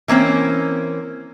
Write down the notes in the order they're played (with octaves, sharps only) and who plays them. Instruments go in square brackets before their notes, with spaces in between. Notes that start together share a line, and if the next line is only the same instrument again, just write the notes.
[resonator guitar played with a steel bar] E3 A#3 C4 C#4